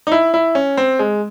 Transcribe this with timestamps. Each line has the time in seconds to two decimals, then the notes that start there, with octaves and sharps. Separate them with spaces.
0.07 D#4
0.12 E4
0.34 E4
0.55 C#4
0.77 C4
0.99 G#3